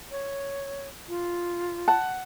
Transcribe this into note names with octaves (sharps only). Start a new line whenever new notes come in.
C#5
F4
F#5 A5